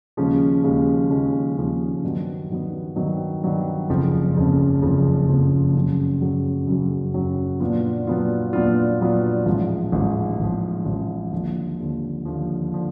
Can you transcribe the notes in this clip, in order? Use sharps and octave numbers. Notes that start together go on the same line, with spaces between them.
D#2 C#3 F3 G#3 C#4
D#2 C#3 F3 G#3 C#4
D#2 C#3 F3 G#3 C#4
D#2 C#3 F3 G#3 C#4
G2 D#3 F#3 B3
G2 D#3 F#3 B3
G2 D#3 F#3 B3
G2 D#3 F#3 B3
F#1 F2 C#3 F3
F#1 F2 C#3 F3
F#1 F2 C#3 F3
F#1 F2 C#3 F3
F#2 C#3 F#3
F#2 C#3 F#3
F#2 C#3 F#3
F#2 C#3 F#3
A#2 F#3 B3 D4 F4
A#2 F#3 B3 D4 F4
A#2 F#3 B3 D4 F4
A#2 F#3 B3 D4 F4
A1 G#2 F3
A1 G#2 F3
A1 G#2 F3
A1 G#2 F3
D#2 D3 F3
D#2 D3 F3
D#2 D3 F3
D3 F3